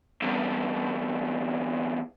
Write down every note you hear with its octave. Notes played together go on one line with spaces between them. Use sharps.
E2 G2